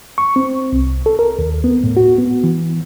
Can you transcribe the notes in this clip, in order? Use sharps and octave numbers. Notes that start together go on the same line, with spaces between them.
C#6
C4
C2
A4
A#4
D#2
B3
A2
F#4
B3
E3